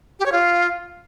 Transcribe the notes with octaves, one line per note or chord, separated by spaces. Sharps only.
G4
C#5
F4